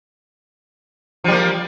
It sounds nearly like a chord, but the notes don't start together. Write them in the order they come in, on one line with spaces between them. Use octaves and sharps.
F3 G3 A#3